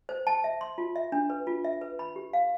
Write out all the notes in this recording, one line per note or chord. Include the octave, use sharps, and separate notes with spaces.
C5
A5
E5
C6
F4
E5
D4
B4
F4
E5
B4
B5
G4
F5